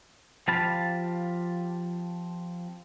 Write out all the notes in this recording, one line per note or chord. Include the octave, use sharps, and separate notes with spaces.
F3 C4 G4 F5 A5 B5